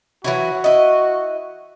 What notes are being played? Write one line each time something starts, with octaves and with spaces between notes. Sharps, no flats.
E3 F#3 E4 F#4
E4 D#5